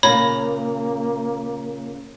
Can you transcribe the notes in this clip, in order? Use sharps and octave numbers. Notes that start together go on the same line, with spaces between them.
A#2 C#3 A#3 C#5 A#5 B5